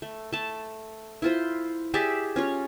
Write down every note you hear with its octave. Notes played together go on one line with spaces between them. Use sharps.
A3
A3 A5
E4 F4 C5
G4 G#4 D5 E5
C#4 F4 C#5